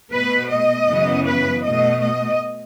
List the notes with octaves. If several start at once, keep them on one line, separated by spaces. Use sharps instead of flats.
B2 A3 B4
D#5
F#2 C#3 E3 B3
B4
B2 A3 D#5
D#5